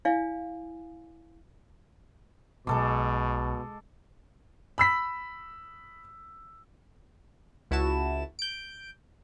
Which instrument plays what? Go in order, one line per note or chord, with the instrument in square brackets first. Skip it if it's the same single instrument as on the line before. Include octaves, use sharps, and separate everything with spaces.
[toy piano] E4 D5 F5 G#5
[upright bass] B1 [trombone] B2 [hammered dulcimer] G#3 A4 D6
[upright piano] B5 E6 B6
[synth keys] C#2 E4 F#4 A5 E7
G6 D7